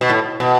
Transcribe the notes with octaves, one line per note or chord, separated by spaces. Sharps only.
B2
A2
B2